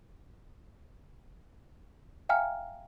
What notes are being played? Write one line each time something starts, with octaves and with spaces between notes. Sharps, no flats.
E5 F5 G5 G#5 A#5 F6